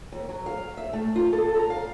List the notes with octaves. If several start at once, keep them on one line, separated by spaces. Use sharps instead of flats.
D#2
F#3
F5
E5
A3
F4
A4
A#5
F5